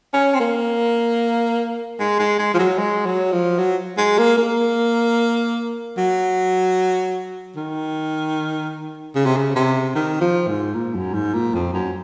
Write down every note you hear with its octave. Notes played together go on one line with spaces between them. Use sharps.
C#4
C4
A#3
G#3
G#3
G#3
F3
F#3
G#3
F#3
F3
F#3
G#3
A#3
A#3
F#3
D#3
C#3
C3
C#3
C3
D#3
F3
G#2
A#2
F#2
G#2
A#2
F2
F#2